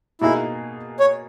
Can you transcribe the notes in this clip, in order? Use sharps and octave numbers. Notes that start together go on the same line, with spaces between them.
B2 A#3 D#4 E4 G#4
C#5